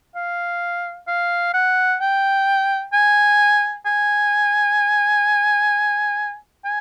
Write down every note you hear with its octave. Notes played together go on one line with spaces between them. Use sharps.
F5
F5
F#5
G5
G#5
G#5
G#5